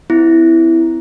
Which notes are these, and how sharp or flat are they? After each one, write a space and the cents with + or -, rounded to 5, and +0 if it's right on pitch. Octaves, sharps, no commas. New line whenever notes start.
C4 -35 E4 +0